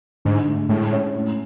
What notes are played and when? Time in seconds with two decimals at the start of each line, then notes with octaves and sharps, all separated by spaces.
0.25 G#2 D3
0.48 A3
0.69 A2 G#3
0.92 C#4
1.14 A2